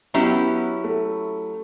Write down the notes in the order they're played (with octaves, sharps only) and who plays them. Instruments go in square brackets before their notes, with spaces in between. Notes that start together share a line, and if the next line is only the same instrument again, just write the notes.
[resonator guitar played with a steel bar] F#3 C#4 E4 G4 [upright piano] B3
[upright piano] A3